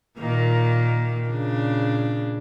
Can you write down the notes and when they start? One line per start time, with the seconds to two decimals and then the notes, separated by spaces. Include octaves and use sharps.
0.18 A#2 D#3 A#3
1.28 A#2 C#3 D4